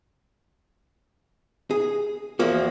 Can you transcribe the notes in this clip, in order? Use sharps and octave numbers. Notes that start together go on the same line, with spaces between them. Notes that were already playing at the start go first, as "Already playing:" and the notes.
G#4
E2 F3 A#3 F#4